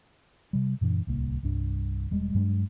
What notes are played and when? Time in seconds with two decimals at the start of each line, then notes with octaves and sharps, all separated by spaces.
0.53 C3 G3
0.81 F#2 A#2 E3 D4
1.07 D1 C2 A#3
1.43 C2 G2 D4
2.11 E1 G3 G#3
2.34 G2 F#3 G#3 D4